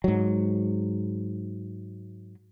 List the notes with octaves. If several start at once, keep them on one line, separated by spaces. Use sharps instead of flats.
G#2 F#3